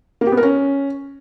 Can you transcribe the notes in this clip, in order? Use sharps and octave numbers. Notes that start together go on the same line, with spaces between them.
A#3
G4
B3
A#4
C#4